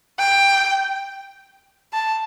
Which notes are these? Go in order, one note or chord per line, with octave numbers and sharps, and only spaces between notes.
G5
A5